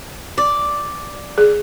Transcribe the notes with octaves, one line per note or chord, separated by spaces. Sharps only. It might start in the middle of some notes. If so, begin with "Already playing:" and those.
D5
G#4